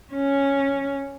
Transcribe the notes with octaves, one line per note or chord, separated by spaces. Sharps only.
C#4